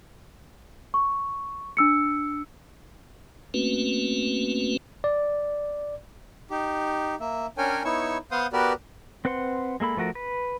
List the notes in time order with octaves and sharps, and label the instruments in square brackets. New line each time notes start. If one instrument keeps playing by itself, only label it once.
[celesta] C#6
D4 E6 C#7
[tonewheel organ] A3 A#3 C4 C#4 F#4 B4
[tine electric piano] D5
[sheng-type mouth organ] D#4 G4
A#3 E5
C#4 D4 A#4 C#5 G5 G#5
B3 D#4 E4 C#5 C#6 E6
B3 C5 F5 F#5 C6 D#6
B3 F#4 G4 A#4 B4 D5
[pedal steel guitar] C4 B4 C5 F#5 C6
G#3 A#3 A4 B5
F3 A3 F#4 A#4
B4